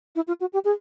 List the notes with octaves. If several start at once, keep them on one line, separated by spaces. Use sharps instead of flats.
E4
F4
F#4
G4
G#4